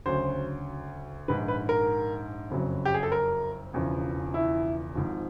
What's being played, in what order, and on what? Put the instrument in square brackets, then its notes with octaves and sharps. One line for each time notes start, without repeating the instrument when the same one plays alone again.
[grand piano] D2 C#3 F#3 C5
A#1 G#2 D#3 B4
B4
A#4
F#1 F2 C#3 F#3
G4
G#4
A4
A#4
E1 E2 C#3 F3
E4
G#1 G#2 F3